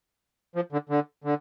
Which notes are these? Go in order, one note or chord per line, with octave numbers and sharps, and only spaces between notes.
F3
D3
D3
D3